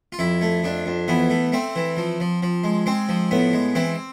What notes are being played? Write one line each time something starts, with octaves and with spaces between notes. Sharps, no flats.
F4
F2 E4
A3
F2 D4
F2
E3 B3
A3
A3 C4
E3
F3
F3
F3
G#3
G#3 C4
F3
A2 B3
G#3
E3 C4